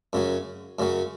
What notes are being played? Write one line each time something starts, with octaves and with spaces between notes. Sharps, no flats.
F#2 C#3 F#3
F#2 C#3 F#3